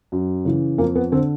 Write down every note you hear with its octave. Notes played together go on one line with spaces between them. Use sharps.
F#2
C#3 E3
F2 A#3
B3
D3 C4